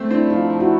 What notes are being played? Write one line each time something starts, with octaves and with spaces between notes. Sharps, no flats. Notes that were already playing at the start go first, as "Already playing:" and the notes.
Already playing: A3 C4
C4 D4 E4
F3 D#4 F4
F3
E4 F#4